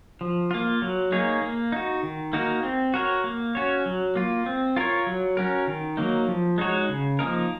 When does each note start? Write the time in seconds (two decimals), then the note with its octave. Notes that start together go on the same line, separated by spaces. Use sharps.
0.21 F3
0.51 A#3 F4
0.82 F#3
1.12 A#3 D#4 G#4 C#5
1.42 A#3
1.72 D#4 F#4
2.03 D#3
2.33 A#3 D#4 F#4 A#4
2.63 C4
2.94 F#4 A#4 C#5
3.24 A#3
3.55 C#4 F#4 C#5
3.86 F#3
4.15 A#3 F4
4.46 C4
4.77 F4 A#4 C#5
5.07 F#3
5.37 C#4 F#4 A#4
5.68 D#3
5.97 F#3 A#3 D#4
6.28 F3
6.58 G#3 D#4 F#4 C#5
6.89 C#3
7.19 F3 A#3 D#4 A#4